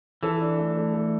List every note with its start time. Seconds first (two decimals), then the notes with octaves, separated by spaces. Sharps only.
0.23 E3 A4
0.41 D4
0.58 A3
0.77 A3
0.94 A3